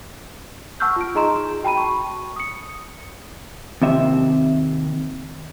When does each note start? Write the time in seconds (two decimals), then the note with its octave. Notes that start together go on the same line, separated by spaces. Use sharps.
0.80 F#5 A5 C#6 E6 F6 G6
0.96 F4 D7
1.15 D#4 G#4 D#5 A#5 C6 E7
1.63 F#4 G5 A5 B5 D#7
1.77 C#6
2.36 D#6 C#7
3.82 D#2 C3 E5